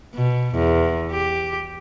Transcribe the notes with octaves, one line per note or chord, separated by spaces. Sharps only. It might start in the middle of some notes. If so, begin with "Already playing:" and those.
B2
E2
G4